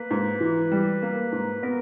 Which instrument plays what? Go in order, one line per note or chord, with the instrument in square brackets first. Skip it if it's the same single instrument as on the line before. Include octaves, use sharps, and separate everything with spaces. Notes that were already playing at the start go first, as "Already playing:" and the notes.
Already playing: [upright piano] A#3 [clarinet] B4
[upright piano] G#2
E3
G3
A#3
G#2
[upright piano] B3 [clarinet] A#4